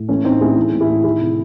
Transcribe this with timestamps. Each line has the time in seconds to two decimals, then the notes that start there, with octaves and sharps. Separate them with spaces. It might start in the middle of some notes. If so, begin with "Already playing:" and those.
Already playing: A2
0.09 E3 A3 C#4
0.24 A2 C4 D#4
0.41 A2 E4 G#4
0.57 E3
0.72 A2
0.80 E4 G#4
0.88 A2
1.04 D#3 E4 G#4
1.20 C3